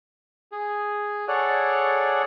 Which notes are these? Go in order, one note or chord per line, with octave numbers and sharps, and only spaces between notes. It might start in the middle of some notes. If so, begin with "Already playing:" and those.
G#4
G#4 A4 C#5 D5 F#5